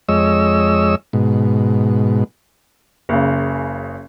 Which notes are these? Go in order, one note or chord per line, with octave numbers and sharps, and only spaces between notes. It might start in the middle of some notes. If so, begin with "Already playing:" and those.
F2 G#3 C#5 D#5 E6
G#2 B2
F#1 C#3